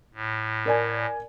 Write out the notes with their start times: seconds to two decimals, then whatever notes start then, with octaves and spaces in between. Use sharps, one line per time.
0.14 A2
0.66 A#4 D5 G#5